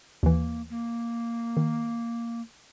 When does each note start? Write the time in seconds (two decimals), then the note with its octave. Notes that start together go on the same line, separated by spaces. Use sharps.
0.23 D#2 E3 A#3
0.70 A#3
1.57 D#3